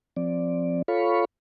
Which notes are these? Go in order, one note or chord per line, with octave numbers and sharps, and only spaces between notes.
F3 C4 D5
F4 A4 C#5 F5 B5 C#6